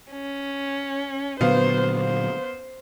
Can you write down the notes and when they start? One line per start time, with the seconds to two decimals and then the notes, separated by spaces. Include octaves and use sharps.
0.12 C#4
1.41 A#2 D3 F#3 B3 C5 F5
1.96 C5